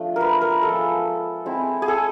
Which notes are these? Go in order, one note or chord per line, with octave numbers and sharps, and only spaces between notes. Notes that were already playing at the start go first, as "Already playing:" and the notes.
Already playing: F3 A3 D4
A#4 B4
A#4
F3 G#3 B3 A4
G#3 C4 E4
G#4
A4